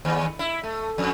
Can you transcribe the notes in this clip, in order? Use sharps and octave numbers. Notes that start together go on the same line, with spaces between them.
D#2
E4
A3
F2